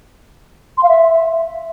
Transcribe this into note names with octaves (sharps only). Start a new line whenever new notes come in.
C6
F5
E5